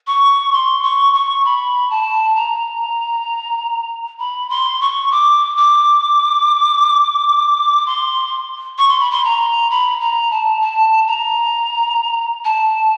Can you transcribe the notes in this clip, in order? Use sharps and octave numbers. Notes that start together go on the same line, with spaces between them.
C#6
C6
C#6
C#6
B5
A5
A#5
B5
C6
C#6
D6
D6
C6
C#6
C6
B5
C6
A#5
B5
A#5
A5
A5
A#5
A5